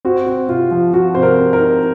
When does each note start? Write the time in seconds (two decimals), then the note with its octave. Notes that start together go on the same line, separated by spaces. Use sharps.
0.05 C4 F#4
0.26 C4
0.49 C3 F4
0.71 F3
0.93 F3 F#4
1.15 C3 C5
1.23 A#4
1.38 C4
1.53 A#4
1.60 D#4